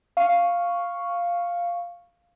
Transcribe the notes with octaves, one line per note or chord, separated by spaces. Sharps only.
F5 C#6